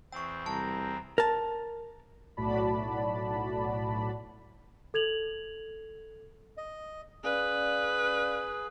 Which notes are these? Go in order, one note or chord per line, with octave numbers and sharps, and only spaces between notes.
E2 C4 G5 C#6
C2 A5 A#5
A#4 A5
B1 A2 F#4 D5 A5 B5
A4 G#6 F7 F#7
D#5
C#4 G#4 B4 D5 F5